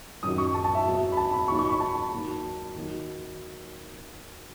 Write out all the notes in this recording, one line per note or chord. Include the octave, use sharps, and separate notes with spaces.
F#2 D#3 F#3 D#6
C#6
A5
A5
E5
E2 B2 F#3
B5
A5
B5
D#2 D#3 F#3 C#6
C#6
B5
A5
D#2 D#3 F#3
D#2 D#3 F#3